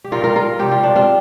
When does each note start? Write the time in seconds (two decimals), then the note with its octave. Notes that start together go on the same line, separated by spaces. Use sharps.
0.04 G4
0.12 A#2 G3 F4 A#4
0.24 F4 A#4
0.36 F4 A#4
0.59 C3 G3 G4
0.72 F4
0.84 D4
0.96 C4 F4